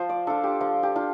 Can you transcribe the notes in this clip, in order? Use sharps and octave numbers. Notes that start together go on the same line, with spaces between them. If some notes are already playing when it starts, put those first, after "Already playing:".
Already playing: F3 C5
D5
D4 F4 A4
G4
F3 F4
G4
D4 F4